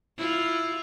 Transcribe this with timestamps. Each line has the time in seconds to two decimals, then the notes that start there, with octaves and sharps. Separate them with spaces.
0.17 E4 F4